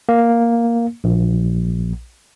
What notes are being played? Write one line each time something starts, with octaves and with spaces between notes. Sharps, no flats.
A#3
A#1